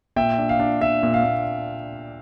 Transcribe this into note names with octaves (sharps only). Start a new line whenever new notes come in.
A#2 E5 G5
D4
F5
D4
D4 E5
A#2
F5
A#2